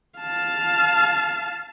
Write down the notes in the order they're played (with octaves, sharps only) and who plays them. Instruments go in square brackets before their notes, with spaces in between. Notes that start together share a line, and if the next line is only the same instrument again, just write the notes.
[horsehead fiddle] F5 A5